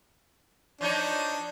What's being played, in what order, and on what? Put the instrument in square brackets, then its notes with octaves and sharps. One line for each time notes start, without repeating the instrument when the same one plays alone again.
[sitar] F3 D#4 C#5 [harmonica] D4